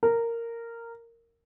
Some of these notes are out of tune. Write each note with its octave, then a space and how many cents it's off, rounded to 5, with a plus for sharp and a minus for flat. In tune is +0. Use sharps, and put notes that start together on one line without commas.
A#4 -10